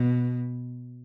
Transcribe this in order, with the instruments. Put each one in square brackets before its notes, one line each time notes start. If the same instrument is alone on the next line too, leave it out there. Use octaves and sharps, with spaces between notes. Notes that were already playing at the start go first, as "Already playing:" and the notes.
Already playing: [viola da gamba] B2